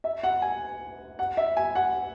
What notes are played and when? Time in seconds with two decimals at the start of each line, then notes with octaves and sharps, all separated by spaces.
0.04 E5
0.23 F#5
0.42 G#5
1.19 F#5
1.37 E5
1.57 G#5
1.75 F#5